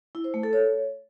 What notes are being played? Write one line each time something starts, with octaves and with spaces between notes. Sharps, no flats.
E4
C5
A3
A4
C#5